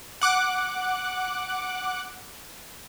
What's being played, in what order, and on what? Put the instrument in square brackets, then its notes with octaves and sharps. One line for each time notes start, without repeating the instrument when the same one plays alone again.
[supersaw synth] F#5 D6 F#6